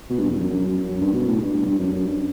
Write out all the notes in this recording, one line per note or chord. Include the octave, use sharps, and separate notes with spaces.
B2
G2
E2
F#2
F#2
F#2
F#2
G2
B2
A2
G2
G2
G2
F#2
F#2
G2